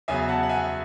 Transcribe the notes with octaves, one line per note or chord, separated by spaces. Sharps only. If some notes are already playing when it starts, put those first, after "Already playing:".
E2 C#3 F#3 B3 E5 G#5
F#5 A5
F#5
E5 G#5